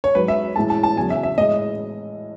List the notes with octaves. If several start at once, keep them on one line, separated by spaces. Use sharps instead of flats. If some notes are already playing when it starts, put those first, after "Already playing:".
C#5
G#2 F#3 B4
E5
A2 E3 G#3 A5
A5
A5
E2 C#3 F#3 G#5
E5
E5
A2 E3 G#3 D#5